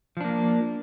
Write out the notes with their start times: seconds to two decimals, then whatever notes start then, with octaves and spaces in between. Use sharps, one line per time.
0.17 F3
0.21 D4
0.24 A#3